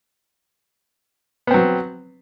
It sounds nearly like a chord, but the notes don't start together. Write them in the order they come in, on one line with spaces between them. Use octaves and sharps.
B3 C4 F#3